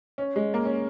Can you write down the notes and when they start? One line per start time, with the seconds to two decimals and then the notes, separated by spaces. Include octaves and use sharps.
0.18 C#4
0.36 G#3
0.54 A#3
0.65 C#4